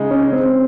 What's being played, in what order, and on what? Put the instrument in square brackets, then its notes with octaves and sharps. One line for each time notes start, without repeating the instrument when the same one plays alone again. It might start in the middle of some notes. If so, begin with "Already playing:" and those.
Already playing: [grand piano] C#3 G#3 D#4
[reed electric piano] C#4
C4